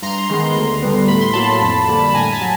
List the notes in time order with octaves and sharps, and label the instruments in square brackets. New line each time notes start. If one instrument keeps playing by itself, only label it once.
[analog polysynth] G2 A#5 C6
D#3 G#3 B3
D2
D3 G3 B3
A2 B5
C6
F#3 A#3 A5 B5
F2
D3 G3 A#3
B5
A2 G#5 A#5
A5 B5
F#3